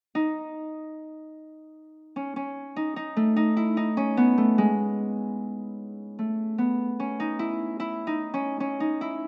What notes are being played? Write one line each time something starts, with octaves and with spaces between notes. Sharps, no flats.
D#4
C#4
C#4
D#4
D#4
A3
D#4
E4
D#4
C#4
B3
A3
G#3
A3
B3
C#4
D#4
E4
E4
D#4
C#4
C#4
D#4
E4